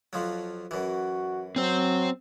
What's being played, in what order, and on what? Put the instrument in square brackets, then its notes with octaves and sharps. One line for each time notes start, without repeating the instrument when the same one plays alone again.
[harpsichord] F2 F3 F#3
[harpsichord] F#2 E3 [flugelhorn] F#4
[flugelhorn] F#3 [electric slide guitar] C4 C5